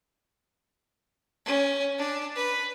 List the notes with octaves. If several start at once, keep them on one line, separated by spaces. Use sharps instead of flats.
C#4
D4
B4